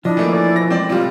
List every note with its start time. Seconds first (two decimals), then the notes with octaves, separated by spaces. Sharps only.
0.05 F3 D4 E4 D#5
0.17 E3 A3 A#3
0.31 C#4 A4 D5
0.56 G#2 B2 E3 A#6
0.70 A2 G#3 C4 D5
0.89 C3 G3 F4